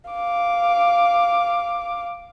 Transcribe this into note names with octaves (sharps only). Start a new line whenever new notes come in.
F5 D6